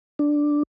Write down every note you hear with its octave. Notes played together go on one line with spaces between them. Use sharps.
D4